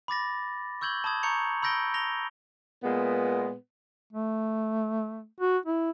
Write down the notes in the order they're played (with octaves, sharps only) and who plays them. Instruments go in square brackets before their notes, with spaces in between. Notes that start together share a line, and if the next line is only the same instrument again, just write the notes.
[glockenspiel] B5 D6 A6 A#6
C#6 E6 G6 G#6 F#7 G7
A5 B5 D#6 G#6
A5 A#5 C#6 G6 C#7 F7
B5 E6 G6 A#6 D7 G7
A#6 F7 G7
[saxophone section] A#2 G#3 B3
[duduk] A3
F#4
E4